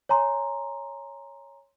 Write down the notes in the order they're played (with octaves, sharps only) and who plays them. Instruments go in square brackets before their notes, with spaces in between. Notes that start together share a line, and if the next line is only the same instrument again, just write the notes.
[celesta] C#5 G#5 A#5 C6